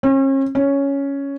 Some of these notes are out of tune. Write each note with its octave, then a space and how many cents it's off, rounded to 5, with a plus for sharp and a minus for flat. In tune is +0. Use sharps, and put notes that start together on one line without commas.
C#4 -40
C#4 +5